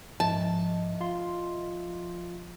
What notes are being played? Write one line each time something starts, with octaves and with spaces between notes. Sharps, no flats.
G#2 F3 D#5 E5 A5
F4 C6